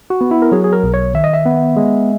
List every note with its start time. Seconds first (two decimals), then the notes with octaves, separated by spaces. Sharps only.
0.10 F#4
0.21 B3
0.31 E4
0.42 A#4
0.52 F#3 G#4
0.64 G#4
0.73 A#4
0.83 B1
0.94 C#5
1.14 D#3 E5
1.24 D#5
1.33 E5
1.46 B3
1.76 G#3